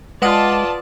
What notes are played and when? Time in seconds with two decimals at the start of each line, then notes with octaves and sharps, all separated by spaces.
0.22 G#3 F4 B4 D5 F#5 A5 D#6